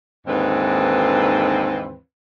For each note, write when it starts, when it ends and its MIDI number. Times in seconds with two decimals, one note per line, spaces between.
0.27 1.96 39
0.27 1.96 44
0.27 1.96 50
0.27 1.96 52
0.27 1.96 60
0.27 1.96 71